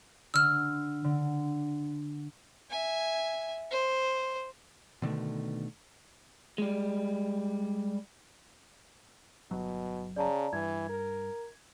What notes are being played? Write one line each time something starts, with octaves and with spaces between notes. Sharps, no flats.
D3 E6 F6
D3
E5 G#5
C5
B2 D3 D#3 A3
G3 G#3
G1 B2 F#3
C#3 D5 A5 A#5
G2 E3 G#6
A#4